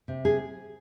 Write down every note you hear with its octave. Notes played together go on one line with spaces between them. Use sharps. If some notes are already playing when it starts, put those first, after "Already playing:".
C3
G#4